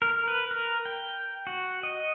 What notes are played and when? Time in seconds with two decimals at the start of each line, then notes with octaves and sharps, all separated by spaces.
0.02 A#4
0.28 B4
0.51 A#4
0.85 G5
1.47 F#4
1.83 D#5